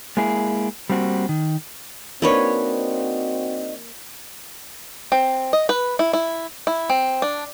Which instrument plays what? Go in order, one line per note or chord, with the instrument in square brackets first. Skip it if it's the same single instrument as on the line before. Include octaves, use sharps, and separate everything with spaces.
[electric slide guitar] G#3 A#3 E4 G#4
G3 A#3 C4 F#4
D#3
[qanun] A#3 B4 C#5 [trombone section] C4 F#4 [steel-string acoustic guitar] D4 D#4 D#5
[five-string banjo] C4
D#5
B4
E4
E4
E4
C4
D4